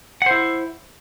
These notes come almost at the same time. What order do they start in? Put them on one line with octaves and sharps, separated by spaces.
F#5 C5 E4